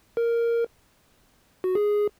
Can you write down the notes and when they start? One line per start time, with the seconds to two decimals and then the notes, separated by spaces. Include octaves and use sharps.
0.17 A#4
1.64 F#4
1.75 G#4